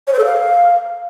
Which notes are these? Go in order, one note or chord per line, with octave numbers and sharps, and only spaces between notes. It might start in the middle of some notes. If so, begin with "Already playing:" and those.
C#5
C5
A4
F5